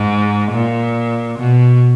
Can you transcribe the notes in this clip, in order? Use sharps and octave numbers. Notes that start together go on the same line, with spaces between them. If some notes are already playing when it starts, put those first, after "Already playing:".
Already playing: G#2
A#2
B2